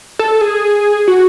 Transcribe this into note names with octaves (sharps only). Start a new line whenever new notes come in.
A4
G#4
F#4